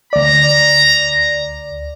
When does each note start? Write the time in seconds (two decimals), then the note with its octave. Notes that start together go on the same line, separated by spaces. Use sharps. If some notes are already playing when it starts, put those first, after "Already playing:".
0.13 D2 D5 A#5